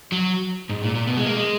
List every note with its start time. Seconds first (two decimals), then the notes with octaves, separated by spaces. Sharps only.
0.12 F#3
0.69 G#2
0.82 A#2
0.95 A#2
1.07 B2
1.17 G#3
1.26 A#3
1.36 G#3